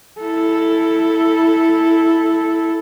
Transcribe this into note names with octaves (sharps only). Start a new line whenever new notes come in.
E4 A4